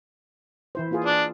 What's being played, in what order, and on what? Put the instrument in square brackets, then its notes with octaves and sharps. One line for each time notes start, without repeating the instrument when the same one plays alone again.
[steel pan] E3 E4 C5
A#3 F4 G#4
[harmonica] D4